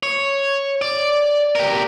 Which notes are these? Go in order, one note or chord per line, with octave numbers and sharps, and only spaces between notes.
C#5
D5
G4 A#4